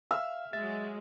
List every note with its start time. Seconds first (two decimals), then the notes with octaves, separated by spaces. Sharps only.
0.11 E5 F5 E6 F6
0.53 F#3 G#3 E5 A6